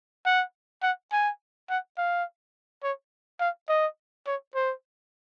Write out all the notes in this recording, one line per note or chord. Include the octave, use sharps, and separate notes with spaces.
F#5
F#5
G#5
F#5
F5
C#5
F5
D#5
C#5
C5